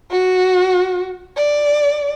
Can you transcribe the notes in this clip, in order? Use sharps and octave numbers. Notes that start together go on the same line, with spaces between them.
F#4
D5